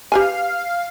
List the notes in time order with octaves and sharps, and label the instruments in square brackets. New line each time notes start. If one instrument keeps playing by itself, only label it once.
[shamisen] G4 B4 G#5 [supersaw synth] F5